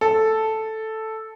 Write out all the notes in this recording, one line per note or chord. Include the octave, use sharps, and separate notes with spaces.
A4